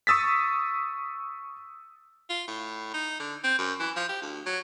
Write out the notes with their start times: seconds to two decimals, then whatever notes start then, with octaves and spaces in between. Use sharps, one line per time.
0.07 C#6 D#6 E6 A6 B6
2.30 F4
2.48 A2
2.94 D#4
3.20 D3
3.44 C4
3.59 F#2
3.80 E3
3.96 F3
4.09 G4
4.22 D2
4.46 F#3